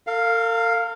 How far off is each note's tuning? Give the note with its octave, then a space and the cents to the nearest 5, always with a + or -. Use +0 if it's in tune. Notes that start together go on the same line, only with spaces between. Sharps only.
A#4 -45 F5 +0